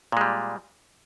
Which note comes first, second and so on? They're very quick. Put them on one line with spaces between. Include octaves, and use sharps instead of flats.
A#2 G#3 G3